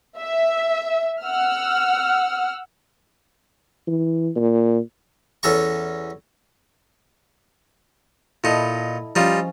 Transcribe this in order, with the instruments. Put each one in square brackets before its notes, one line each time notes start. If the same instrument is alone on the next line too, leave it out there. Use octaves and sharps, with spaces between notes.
[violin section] E5
F#5 E6 F6
[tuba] E3
A#2
[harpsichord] E2 C#4 A4 A#5 C#6
[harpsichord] A#2 D#4 [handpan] E4 A4 D#5
[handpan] F3 C#4 [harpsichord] G3 D#4 F4